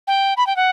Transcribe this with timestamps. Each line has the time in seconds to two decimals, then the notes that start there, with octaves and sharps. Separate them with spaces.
0.07 G5
0.37 B5
0.47 G5
0.56 F#5